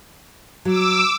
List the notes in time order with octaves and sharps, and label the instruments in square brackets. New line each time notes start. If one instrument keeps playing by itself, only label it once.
[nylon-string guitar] F#3 [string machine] D6 E6